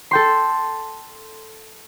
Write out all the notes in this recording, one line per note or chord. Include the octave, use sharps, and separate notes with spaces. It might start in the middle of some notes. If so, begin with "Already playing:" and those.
A4 G5 C6